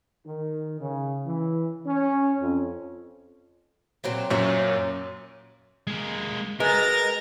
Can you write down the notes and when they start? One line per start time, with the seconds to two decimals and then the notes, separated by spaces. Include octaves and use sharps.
0.25 D#3
0.80 C#3
1.25 E3
1.86 C#4
2.41 F2
4.04 A#2 F#3 C4
4.30 F#2 A#2 F#3 C#5 E5
5.87 G#3 A#3
6.60 G#3 A#4 B4 D#5 A#5 A6 A#6